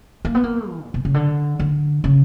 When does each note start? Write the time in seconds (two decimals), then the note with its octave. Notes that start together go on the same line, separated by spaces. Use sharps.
0.25 A#3
0.35 B3
0.44 A#3
0.70 E3
0.84 A#2
0.94 B2
1.05 C#3
1.14 D3
1.60 D3
2.04 C#3